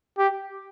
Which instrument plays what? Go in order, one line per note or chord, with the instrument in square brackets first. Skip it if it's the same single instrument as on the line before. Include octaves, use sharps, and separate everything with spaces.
[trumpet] G4